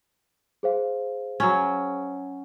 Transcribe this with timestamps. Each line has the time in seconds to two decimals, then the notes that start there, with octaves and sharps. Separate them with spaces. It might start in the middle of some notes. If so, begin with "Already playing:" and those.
0.63 G#4 C5 F5
1.40 F#3 C#4